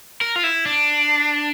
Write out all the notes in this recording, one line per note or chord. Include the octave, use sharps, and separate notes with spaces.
A#4
F4
E4
D4